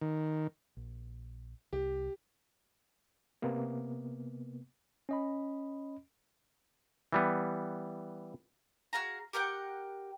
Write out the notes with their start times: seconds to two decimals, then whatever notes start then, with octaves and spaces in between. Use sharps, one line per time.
0.01 D#3
0.77 A#1
1.73 C2 G4
3.42 C3 A#3 B3
5.09 C#4 D#5 B5
7.13 E3 G3 B3
8.93 F#4 G#4 F5 A#5
9.33 G4 A#4 F#5 G5